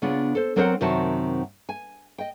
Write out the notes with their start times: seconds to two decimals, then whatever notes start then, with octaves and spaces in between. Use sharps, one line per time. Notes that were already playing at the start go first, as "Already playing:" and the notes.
0.02 C#3 B3 D4 F4
0.35 A4 C5
0.56 F#3 C4 A#4 C5 D#5 F#5
0.81 F#2 C3 D#3 C4 F#4 A5
1.69 G#5
2.18 D#5 G5